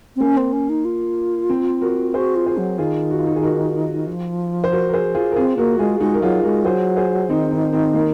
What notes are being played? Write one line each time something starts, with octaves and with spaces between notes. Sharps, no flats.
C4
A#3 C#4
C4
C#4
D#4
F4
C4
F#4 A#4
F#4 G#4 C5
F4
G#4 C5
F#3
D#3 F4 G#4
F#4
F4
D#4 F#4
G#4
F#4 A#4
F3
C5
F#4 A#4
A#4
G#4 C5
F4 G#4
A#4
C4 F4 G#4
A#3 F#4 A#4
F#4
G#3 F4 G#4
G#3 D#4 F#4
A#4
F#3 F4 G#4
G#3 F#4 A#4
F#3 G#4 C5
G#4 C5
D#3 C4 D#4
C4 D#4
C4
A#3